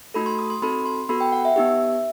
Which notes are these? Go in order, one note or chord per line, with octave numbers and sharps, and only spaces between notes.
A3 D#4 F#4 A4 B5
C6
D#6
C6
C4 D#4 F#4 A4 B5
C6
B3 F#4 A4 B5
G5
F#5
E5
B3 D#4 G4